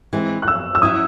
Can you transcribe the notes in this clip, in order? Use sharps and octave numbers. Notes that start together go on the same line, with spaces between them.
E3 G#3 C4 E4
F#6
E6
E6
F#3 C#4 E4 D#6